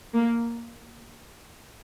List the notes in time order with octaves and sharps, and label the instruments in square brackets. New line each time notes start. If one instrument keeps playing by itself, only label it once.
[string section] A#3